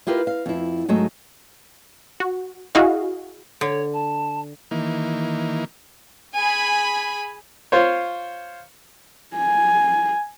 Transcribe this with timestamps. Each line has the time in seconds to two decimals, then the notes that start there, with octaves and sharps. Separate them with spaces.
0.07 E4 F4 G4 A#4 B4
0.27 F5
0.46 F2 E4
0.88 G#2 F#3 A3 D#5 E5
2.20 F#4
2.75 E4 F#4 G#4 D#5 F5
3.61 D3 C#5
3.93 A5
4.71 D#3 E3 A#3
6.36 G#4 G#5 B5
7.72 F4 C5 C#5
9.36 G#5